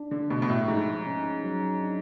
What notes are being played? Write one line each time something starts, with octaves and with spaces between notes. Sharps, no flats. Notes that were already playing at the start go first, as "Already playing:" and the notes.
Already playing: D4
D3
B2 A3
B2
A2
G#2 F3
C#4
F#3
D4